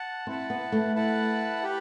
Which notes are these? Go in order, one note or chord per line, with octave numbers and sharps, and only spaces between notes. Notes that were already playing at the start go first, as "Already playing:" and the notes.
Already playing: F#5 A5
C4 E4 B4 F#5 A5
B3
A3
E4 B4 F#5 A5
G4 B4